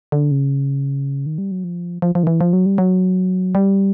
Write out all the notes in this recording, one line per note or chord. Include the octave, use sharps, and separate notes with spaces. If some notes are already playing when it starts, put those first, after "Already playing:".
D3
C#3
D#3
G3
F#3
F3
F3
F3
D#3
E3
F3
F#3
G3
F#3
G3